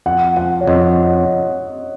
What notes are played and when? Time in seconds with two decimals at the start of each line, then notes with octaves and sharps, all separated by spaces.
0.06 F2 F#5
0.36 F3 F#5
0.61 C#5
0.67 F2 D#5